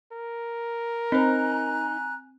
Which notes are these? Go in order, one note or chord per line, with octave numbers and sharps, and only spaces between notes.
A#4
C4 D#4 C5 G#5 A#5 F#6